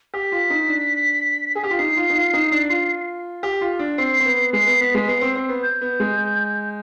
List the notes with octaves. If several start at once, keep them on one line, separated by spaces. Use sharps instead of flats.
G4 B6
F4
D#4
D4
G#4
G4
F4
D#4 C7
F4
D#4
F4
D#4
D4
F4
G4
F4
D4
C4 C7
C4
B3
G#3 C7
B3
B3 B6
G#3
B3 C7
C4
C4
B3
G6
B3
G#3